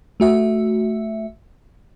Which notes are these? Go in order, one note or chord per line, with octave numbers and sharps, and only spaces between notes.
A3 F#4 E5